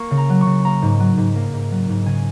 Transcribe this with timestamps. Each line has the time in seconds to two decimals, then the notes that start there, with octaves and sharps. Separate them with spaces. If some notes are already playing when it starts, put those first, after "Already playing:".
Already playing: A#3 C#6
0.11 C#3
0.17 A#5
0.30 F#3
0.41 C#6
0.46 C#3
0.65 A#3 A#5
0.82 G#2
1.00 F#3
1.18 G#2
1.35 A#3
1.53 G#2
1.71 F#3
1.89 G#2
2.06 C#3 G#5